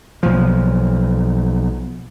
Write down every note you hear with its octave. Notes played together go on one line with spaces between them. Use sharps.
B1 F3